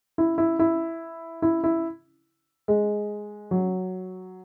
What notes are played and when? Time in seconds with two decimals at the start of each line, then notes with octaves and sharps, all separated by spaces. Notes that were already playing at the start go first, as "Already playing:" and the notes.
0.18 E4
0.38 E4
0.59 E4
1.42 E4
1.64 E4
2.68 G#3
3.51 F#3